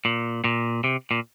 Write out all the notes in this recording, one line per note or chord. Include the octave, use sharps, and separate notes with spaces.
A#2
A#2
C3
A#2